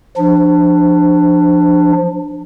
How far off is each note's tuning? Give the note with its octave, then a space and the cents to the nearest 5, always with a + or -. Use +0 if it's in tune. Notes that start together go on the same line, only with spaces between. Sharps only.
F3 +0 D4 +15